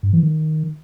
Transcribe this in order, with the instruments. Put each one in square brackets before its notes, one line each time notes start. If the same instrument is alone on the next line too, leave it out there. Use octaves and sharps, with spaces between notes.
[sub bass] G2
E3
D#3